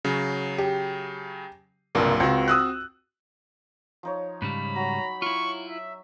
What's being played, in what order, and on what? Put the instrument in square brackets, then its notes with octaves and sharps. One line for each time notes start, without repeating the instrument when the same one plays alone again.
[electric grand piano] C#3 F#3
[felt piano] G4
[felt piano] F#1 G2 A#3 [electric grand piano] C2 A#2
[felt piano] C#2 [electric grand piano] C4 F#4
[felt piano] D#6 E6 F#6
[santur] F3 D#4 C#5
[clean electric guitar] G#2 C#3 G3 [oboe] B5
[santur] F#3 [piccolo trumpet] A#5
[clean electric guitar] E4 F4 [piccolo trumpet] C#6
[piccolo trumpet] E5